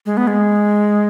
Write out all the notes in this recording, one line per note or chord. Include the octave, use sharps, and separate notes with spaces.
G#3
B3
G#3